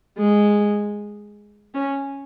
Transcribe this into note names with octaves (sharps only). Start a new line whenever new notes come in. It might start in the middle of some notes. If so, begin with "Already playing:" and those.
G#3
C#4